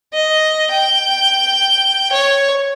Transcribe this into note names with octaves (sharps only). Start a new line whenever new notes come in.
D#5
G5
C#5